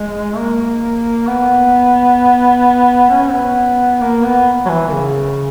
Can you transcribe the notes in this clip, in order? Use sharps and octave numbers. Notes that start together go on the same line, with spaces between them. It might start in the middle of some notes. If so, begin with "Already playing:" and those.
Already playing: G#3
A#3
B3
C#4
B3
A#3
B3
F#3
E3
D#3
C#3